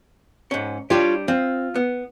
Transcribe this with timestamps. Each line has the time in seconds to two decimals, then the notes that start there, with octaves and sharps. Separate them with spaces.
0.51 G#2 C#4
0.90 G3 D4 F4 G4 C#5 D5
1.28 C4 F4
1.75 B3